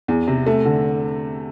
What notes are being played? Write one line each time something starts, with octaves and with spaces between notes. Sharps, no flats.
E2
C3
A3
D3